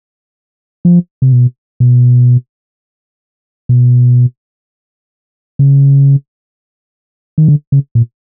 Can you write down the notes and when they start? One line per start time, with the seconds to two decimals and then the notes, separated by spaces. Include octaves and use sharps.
0.85 F3
1.22 C3
1.32 B2
1.80 B2
3.69 B2
5.59 C#3
7.38 D#3
7.48 D3
7.72 C#3
7.95 A#2